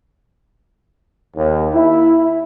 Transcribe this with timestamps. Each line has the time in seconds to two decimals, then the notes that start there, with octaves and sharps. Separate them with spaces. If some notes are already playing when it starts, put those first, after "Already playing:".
1.37 D#2
1.74 E4